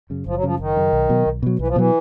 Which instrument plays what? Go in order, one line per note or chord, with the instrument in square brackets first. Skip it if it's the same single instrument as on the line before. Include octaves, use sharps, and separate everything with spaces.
[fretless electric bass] F#2 C#3
[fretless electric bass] F#1 [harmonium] F3
[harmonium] F#3
[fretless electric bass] F#2 C#3 [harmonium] F3
[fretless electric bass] F#1 [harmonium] D#3
[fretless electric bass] F#2 C#3
B1
B2 F#3
B1
B2 F#3
[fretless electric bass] B1 [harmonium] E3
[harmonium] F3
[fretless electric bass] B2 F#3 [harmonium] E3